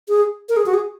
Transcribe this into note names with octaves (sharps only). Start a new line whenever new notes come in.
G#4
A#4
G#4
F#4
G#4